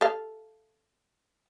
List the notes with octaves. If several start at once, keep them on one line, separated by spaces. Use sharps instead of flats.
A4 F5